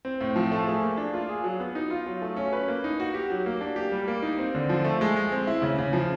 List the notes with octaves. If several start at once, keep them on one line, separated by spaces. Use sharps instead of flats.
C4
A2
F3
A3
G#4
A#3
D4
F4
G#4
F#3
B3
D#4
F4
F#3
A3
C#4
B4
A#3
D#4
F#4
G4
F#3
A#3
D4
G4
G3
A#3
D#4
C4
D3
F3
A3
G#3
G#3
C4
E4
C#3
C#3
F3